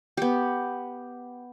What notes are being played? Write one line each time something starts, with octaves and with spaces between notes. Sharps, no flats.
B3 G4